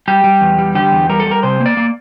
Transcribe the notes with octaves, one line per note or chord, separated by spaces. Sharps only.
G3 G4
G3
E2
G3
D3 G4
E2
G3 A#4
A4
G3
A#4
C3 C5
A#3
D5
A#3